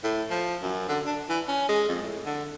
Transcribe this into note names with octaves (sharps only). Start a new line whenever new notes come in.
A2
F3
F#2
D3
D4
E3
C#4
G#3
F2
A2
D3